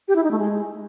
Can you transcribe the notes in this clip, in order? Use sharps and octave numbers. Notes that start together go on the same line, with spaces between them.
G4
E4
D#4
A3
G#3